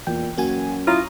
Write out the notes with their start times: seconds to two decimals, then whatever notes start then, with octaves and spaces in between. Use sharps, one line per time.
0.07 E2 A#2 G5
0.37 F#2 A#3 F#4 G#5
0.87 E4 F4 C#5 A#5 D#6